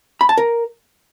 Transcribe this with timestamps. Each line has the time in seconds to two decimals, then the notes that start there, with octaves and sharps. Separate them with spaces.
0.21 B5
0.29 A5
0.38 A#4